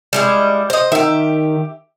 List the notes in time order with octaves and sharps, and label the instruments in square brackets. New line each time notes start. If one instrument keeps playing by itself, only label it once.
[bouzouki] G3 G#3 E4
C5 D#5
[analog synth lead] D#3 [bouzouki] G4 E5